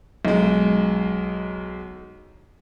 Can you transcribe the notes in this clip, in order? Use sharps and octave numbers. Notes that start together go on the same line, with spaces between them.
B1 G#3